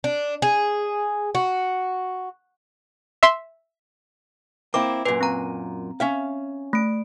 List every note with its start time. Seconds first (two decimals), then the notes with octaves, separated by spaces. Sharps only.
0.04 D4
0.42 G#4
1.35 F#4
3.23 E5 C6
4.74 A#3 C4 E4 D6
5.05 F#2 A#2 B4
5.21 C4 A#5
6.00 C#4 E5 F5
6.73 A3 D7